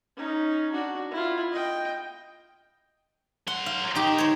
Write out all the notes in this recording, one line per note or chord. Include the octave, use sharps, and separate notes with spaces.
C#4 D#4
D4 F#4
E4 F4
D#5 G5
F#3 F#5 C6
F5
D#3 D#4 G4
C5 C#5